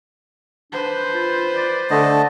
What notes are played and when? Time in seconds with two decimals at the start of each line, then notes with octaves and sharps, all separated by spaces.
0.72 D4 B4 C5
1.12 F4
1.55 D5
1.90 D3 A3 D#5 A5